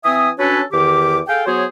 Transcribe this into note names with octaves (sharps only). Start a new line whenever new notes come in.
E3 C4 E5 G#5 D#6
C#4 D4 F#4 A4 B4 C#5
E2 D#3 G4 D6
G#4 A4 F5 G5
F#3 B3 F#4 G#4 C5 C#5